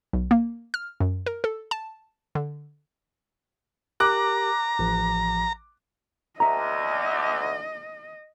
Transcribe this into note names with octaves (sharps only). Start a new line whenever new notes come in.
B1
A#3
F6
F#2
A#4
A4
A5
D3
G4 A#4 A#5 D6 F#6
A1 F3
D2 D#5 E5 A#5